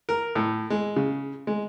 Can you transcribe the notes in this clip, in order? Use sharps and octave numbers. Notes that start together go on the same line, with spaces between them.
A#4
A2
G#3
C#3
G#3